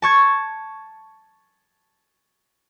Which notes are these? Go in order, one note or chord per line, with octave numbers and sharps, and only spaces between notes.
A5 C#6 G#6